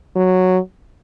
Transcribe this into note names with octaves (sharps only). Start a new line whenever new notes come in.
F#3